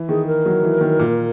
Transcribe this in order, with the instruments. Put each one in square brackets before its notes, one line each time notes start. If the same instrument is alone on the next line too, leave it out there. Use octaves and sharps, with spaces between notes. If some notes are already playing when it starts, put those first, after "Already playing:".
Already playing: [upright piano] E3
[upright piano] D#3 [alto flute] G#4
[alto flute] A#4
[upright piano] F#3
E3
D#3
A#2